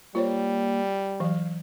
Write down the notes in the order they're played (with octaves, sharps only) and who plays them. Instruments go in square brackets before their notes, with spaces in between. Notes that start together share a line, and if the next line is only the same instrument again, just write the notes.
[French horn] G3 [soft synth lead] A#3 [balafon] F4 C5 C#5
[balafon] E3 F#3 [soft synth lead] F5